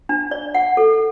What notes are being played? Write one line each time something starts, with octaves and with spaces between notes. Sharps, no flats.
D4
D5
F#5
A4